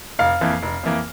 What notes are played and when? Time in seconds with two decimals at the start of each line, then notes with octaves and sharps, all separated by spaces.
0.19 F1 F5
0.41 F2 E3 A#3
0.63 F1
0.83 F2 E3 A#3